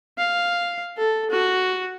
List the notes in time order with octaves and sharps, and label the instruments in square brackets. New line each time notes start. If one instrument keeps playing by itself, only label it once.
[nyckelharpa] F5
A4
F#4